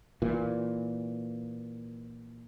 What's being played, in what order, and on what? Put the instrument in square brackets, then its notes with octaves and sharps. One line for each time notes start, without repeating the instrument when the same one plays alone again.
[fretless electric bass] A#2 E3